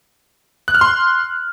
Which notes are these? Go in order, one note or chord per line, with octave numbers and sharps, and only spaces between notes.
F#6
F6
C6